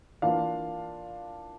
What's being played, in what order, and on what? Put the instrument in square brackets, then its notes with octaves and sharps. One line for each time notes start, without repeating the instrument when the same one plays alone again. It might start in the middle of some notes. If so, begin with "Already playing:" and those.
[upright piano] E3 A#3 D4 F4 F5